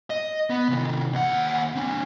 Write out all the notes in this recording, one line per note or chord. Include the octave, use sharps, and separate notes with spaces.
D#5
B3
C3 D#3
D#2 F#5
C4 D4